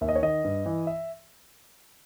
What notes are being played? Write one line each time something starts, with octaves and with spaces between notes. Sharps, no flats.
D#2 E5
D#5
C#5
D#3 D#5
G2
E3
E5